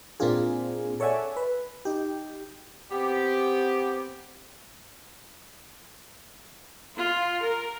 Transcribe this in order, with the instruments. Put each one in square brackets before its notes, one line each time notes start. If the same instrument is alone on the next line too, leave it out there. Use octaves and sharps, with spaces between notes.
[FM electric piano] A#2 A#3 C4 D4 F4 G#4
A4 C#5 D5 E5 F#5 G#5
B4
D#4 G4
[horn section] B3 C4 G4
[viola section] F4
A#4